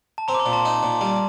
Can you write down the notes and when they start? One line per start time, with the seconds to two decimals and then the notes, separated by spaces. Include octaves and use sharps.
0.18 A5
0.28 C4 A#5
0.34 D6
0.40 C6
0.46 A#2
0.53 A5
0.65 D#4
0.83 A#2
1.01 G3